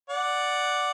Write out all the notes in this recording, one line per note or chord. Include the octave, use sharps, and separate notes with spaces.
D5 F#5